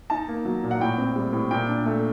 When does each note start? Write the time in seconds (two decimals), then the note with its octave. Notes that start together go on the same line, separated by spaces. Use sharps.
0.10 D#4 A5
0.28 A#3
0.45 F#3
0.64 A#2
0.71 F#5
0.80 A2 G5
0.98 C4
1.16 G3
1.33 A2
1.51 A#2 G5
1.68 D4
1.86 A3